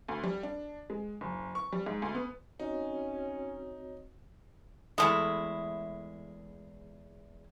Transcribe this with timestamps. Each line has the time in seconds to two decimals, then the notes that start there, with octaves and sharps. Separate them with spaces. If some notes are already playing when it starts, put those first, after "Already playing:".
0.08 D2
0.24 G3
0.43 D4
0.90 G#3
1.21 F#1
1.55 C#6
1.72 G3
1.86 G#2
2.02 D2
2.15 B3
2.60 C4 C#4 D#4 F#4 C#5
4.98 E2 G#2 G#3 A3 E4